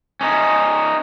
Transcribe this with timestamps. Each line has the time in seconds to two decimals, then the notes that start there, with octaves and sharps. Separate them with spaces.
0.21 C#4 D#4